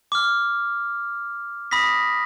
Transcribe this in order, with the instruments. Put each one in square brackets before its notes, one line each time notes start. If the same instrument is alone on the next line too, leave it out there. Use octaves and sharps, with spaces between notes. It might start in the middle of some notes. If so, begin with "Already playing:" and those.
[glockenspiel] D6 F6
B5 D#6 A#6 B6